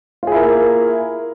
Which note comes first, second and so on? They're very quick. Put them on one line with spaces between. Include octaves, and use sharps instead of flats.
F4 G#4 E4 A#4 A#3